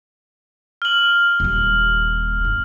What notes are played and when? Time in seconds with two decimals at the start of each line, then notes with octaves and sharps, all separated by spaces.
0.82 F6 F#7
1.40 D#1 D#2
2.45 G1